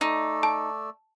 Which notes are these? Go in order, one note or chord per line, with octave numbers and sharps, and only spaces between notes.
A3 D#4 D5 E6
A5